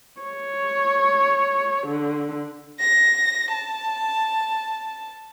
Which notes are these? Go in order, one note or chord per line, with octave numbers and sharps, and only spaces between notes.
C#5
D3
A#6
A5